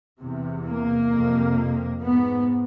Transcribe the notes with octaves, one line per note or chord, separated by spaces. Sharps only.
E2 C3
A#3
F2 C3
G#2 B3